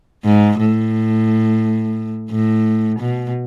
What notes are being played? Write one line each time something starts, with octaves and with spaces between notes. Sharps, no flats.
G#2
A2
A2
B2